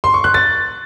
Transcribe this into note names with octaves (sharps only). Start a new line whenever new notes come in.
C6
C#6
F#6
A6